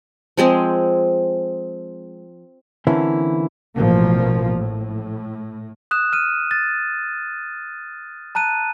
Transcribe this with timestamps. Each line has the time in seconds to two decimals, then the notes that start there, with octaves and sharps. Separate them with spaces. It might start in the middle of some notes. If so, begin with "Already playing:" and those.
0.37 F3 G#3 C4 G#4
2.87 D3 E3 A#3 C4 C#4 E4
3.75 A1 B2 F3 A#3
4.55 A2
5.91 D#6 F#6 E7
6.13 F6 D#7
6.51 A6
8.35 A5 A#5 F#6 D#7